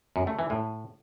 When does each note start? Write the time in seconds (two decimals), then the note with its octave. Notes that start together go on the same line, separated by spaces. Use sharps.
0.16 F#2
0.27 A3
0.39 E3
0.50 A2